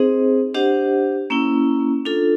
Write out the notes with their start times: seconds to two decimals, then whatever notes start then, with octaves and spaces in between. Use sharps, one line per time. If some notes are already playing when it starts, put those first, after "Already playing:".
Already playing: C4 D#4 G#4 C5 D#5
0.54 D4 G4 C5 D#5 F#5
1.30 A#3 C#4 E4
2.05 D4 F4 A4